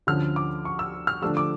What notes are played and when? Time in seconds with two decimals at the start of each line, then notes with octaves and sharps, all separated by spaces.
0.07 D2 D3 F3 C#4 F6
0.36 D6
0.65 C#6
0.79 E6
1.07 F6
1.22 D3 F3 A3 D4 E6
1.37 D6